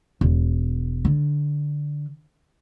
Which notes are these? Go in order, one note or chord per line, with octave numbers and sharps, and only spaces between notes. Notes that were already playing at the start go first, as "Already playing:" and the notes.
E1
D3